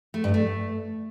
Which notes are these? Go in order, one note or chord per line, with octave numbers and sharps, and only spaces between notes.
A3
G2
A3